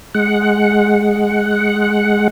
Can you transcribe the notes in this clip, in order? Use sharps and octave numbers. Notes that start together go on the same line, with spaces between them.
G#3 F#5